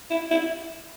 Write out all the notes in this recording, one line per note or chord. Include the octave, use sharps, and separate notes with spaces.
E4
E4